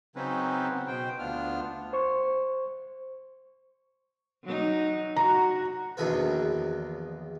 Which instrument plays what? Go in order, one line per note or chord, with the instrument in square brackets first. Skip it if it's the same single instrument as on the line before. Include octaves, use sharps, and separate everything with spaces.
[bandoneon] C#3 F#3 C4 C#4 D#4 B4
B3
B2 C5 G5
D2 B3 D4 F4 F6
[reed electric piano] C5 C#6
[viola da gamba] F#3 D#4
[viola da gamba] F#4 [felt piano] A#5
[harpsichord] A#1 E2 B2 D#3 E4 B4